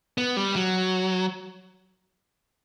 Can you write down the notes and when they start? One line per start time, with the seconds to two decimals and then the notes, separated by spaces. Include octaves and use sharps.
0.18 B3
0.37 G3
0.56 F#3